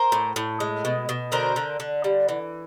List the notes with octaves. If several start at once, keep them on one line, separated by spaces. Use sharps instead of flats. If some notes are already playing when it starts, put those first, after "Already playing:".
Already playing: A#4 C5
A2
A2
G#3
B2
B2
D3 A#4 C5
D3
D3
G3
E3